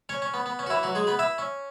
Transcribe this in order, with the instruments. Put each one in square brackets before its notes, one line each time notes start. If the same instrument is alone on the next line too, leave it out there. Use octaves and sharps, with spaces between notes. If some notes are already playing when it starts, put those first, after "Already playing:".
[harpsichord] C#4 C#5
C#4
B3
B3
C#4
F#4
E3 E4
F#3 F#4
G#3 G#4
B3 B4
E4 E5
C#4